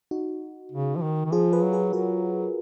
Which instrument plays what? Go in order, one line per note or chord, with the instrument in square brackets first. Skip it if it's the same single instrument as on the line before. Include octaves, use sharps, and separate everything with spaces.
[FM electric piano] D#4 F#4
[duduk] C#3
F3
D#3
D#3
[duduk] F3 [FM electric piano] F4 G#4
[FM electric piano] G#4 B4
[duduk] F#3
[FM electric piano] G#4 B4
[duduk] F#3 [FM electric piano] F#4 A#4